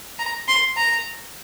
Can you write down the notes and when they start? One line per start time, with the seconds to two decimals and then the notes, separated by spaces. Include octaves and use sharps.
0.19 A#5
0.49 C6
0.77 A#5